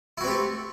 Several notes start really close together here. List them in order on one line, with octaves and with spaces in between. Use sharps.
E4 F#4 C4 G4 A3